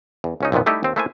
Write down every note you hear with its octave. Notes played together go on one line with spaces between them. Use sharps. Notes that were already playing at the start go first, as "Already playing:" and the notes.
E2
C#2 C#4 D#4
B1 F2 A#2 D#3 B3
G3 A3 D#4 E4 G4
D#2 C4
A3 A#3 E4 C5 F5 G#5